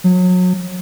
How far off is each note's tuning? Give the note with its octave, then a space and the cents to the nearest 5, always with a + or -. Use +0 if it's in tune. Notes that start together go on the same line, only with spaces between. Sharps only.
F#3 -30